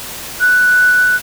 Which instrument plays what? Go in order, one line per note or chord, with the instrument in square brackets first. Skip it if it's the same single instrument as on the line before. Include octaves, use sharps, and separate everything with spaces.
[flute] F#6